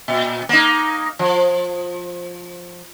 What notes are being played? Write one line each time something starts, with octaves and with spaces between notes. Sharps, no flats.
A#2
A#3 D#4
F3